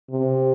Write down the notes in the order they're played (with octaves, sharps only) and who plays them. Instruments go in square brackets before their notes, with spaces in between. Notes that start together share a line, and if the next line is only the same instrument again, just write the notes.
[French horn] C3